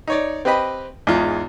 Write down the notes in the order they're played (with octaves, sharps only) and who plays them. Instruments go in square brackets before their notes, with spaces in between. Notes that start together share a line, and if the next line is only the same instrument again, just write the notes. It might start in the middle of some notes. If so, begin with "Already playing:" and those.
[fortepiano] D#4 C#5 D5
C4 G4 B4 D#5 B5
E2 G#2 D#4 F4